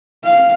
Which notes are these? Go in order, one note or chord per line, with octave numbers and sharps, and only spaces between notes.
F5